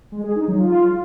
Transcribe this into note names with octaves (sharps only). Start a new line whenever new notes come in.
G#3
G#4
D#4
F#3
F4